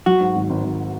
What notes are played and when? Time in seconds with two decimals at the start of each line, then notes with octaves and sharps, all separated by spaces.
0.06 F#3 F#4
0.20 G#2
0.35 G#1
0.50 G#1
0.64 G#1